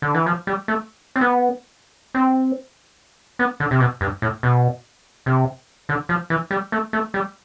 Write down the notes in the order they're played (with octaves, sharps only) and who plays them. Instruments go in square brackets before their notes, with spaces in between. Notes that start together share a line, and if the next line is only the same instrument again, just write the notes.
[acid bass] D3
E3
F3
G3
A3
C4
B3
C4
B3
D3
C3
B2
G2
A2
B2
C3
D3
F3
E3
G3
A3
A3
G3